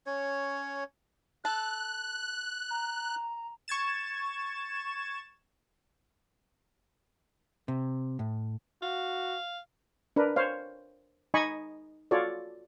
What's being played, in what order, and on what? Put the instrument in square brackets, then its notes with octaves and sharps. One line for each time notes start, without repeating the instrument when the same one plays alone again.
[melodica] C#4 C#5
[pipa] A4 [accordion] F#6
[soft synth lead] A#5
[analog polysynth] C#6 G#6 A6 E7
[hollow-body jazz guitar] C3
A2
[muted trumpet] F#4 [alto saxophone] F5
[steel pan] D4 A#4 B4
C5 C#5 F5
D#4 D#5 G#5 B5 C#6
F4 F#4 A4 C#5 D5